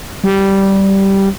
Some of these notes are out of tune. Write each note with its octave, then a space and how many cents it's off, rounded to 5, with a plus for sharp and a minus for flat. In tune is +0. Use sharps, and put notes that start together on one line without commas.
G3 -10